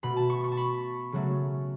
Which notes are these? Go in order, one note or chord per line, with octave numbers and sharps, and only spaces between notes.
B2 A3 B5
A5
C#6
C#6
A5
B5
C#3 F#3 A3